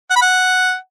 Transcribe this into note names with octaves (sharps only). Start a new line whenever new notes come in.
F#5
B5
F#5